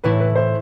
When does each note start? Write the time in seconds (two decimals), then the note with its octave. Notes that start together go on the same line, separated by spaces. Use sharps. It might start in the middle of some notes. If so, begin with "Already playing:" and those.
0.04 A2 E3 A3 E4 B4
0.20 B4
0.35 C5